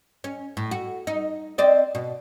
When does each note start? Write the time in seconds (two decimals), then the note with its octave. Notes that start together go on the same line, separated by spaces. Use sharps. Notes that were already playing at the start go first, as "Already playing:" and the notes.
0.24 C#4
0.57 A2
0.71 F#4
1.07 D#4
1.58 C4 D5 D#5
1.95 B2